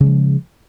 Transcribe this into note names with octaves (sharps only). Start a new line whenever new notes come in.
C#3 F3 G#3